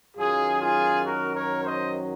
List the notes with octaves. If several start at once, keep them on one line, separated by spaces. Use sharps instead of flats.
F#2 D#3 F#3 F4 G#4
F4 G#4
F#4 A#4
A#4 C#5
C5 D#5